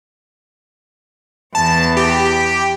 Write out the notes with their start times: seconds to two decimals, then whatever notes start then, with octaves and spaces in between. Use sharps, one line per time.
1.55 E2 E3 A5
1.97 G4